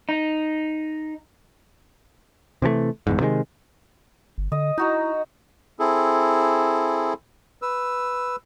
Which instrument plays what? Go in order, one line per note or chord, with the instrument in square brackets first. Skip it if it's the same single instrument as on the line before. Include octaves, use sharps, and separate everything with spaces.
[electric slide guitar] D#4
[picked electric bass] C3 E3 F3 A3
G1 E2 G#2
C3 D#3 F3 G#3
[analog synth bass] G1
[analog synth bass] D3 [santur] D#5
[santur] D#4 F#4 A#5 [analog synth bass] E4
[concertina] C4 E4 G#4 A4
B4 E6